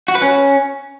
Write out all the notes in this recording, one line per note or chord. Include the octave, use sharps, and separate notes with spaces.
F#4
B4
C#4